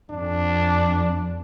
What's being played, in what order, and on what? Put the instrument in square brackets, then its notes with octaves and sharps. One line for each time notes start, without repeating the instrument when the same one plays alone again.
[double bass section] F2 [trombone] D4